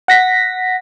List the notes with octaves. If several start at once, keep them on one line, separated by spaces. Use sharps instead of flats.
F#5 A#6 B6